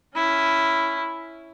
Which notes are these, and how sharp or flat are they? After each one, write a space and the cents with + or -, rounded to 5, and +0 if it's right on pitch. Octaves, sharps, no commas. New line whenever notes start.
C#4 +5 E4 +0